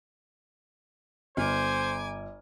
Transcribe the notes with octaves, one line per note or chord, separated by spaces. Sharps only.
G1 C5 G#5 D6 F6